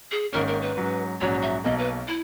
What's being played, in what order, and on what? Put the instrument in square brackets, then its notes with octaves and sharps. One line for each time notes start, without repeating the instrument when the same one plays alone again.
[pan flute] G#4
[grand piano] G#1 G#2 D#3 A#3 C#4 [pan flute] A#4
[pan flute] A#4
B4
[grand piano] G#2 F#3 C#4
[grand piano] A#1 G#2 F#3 C#4 F#4 [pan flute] C#5
[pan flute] E5
[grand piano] B1 B2 A#3 [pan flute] D#5
[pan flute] B4
E4